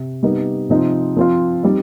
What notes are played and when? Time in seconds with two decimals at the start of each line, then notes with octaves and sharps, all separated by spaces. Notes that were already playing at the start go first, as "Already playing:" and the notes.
Already playing: C3
0.23 C3 G3 B3 D#4
0.69 C3 F3 C4 D#4
1.17 F3 C4 F4
1.63 G3 C4 D#4